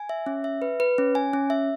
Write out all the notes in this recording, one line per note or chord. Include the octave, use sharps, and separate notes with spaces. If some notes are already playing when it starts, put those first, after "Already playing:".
Already playing: G#5
E5
C#4
E5
B4
B4
C#4
G#5
C#4
E5